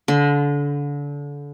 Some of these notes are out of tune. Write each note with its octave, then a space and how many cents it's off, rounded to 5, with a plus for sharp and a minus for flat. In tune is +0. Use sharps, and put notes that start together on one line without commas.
D3 -30 C6 -40